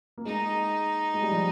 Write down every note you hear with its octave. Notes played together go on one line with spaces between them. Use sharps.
A#3
G#3 D#4
G#3
G3
F3